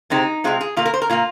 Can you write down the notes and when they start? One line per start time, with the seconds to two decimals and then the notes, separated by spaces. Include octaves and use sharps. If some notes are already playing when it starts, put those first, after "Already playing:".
0.10 C3 G#3 C4 D#4
0.44 C3 G#3 C4 F4
0.61 G#4
0.77 A#2 A#3 F4
0.85 A#4
0.94 C5
1.02 A#4
1.10 A#2 A#3 F4